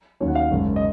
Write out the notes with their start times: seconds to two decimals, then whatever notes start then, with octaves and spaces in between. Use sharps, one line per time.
0.20 D#2 D#3 F#3 C#4 C#5
0.28 F#5
0.35 F5
0.51 G#1 F#2 C#3
0.76 D#5